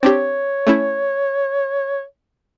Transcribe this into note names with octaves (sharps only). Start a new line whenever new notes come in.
C4 D4 G4 C#5
A3 C#4 E4